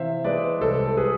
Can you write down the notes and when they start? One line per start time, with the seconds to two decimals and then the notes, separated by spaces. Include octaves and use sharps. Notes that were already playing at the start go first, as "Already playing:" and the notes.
Already playing: C3 E3 C5 E5 F5
0.24 G#3 B4 D5
0.61 C2 A4 C5
0.86 A4
0.97 G#4 B4